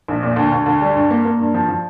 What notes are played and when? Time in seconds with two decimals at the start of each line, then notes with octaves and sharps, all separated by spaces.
0.08 A#1
0.23 A#2
0.36 D2
0.52 D2
0.66 D2
0.81 G3
0.95 G2
1.10 A#3
1.25 A#3
1.39 G2
1.54 F3
1.68 F3